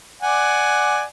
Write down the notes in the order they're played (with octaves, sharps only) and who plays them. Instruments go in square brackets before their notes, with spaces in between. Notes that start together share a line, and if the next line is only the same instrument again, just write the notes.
[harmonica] D5 F#5 G#5